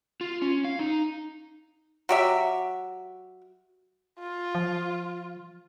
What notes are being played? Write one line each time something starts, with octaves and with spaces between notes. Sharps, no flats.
F4
C#4
F5
D#4
F#3 G4 E5
F4
F3